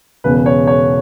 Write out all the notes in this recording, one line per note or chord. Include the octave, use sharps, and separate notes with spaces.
E1 E2 C#3 B4
C#5
C#5